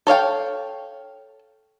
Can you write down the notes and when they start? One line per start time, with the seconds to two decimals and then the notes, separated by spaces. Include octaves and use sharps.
0.07 A4 C#5 F5 G5